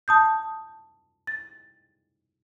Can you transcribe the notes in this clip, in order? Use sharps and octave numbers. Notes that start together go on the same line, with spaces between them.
A5 D#6 G6
A6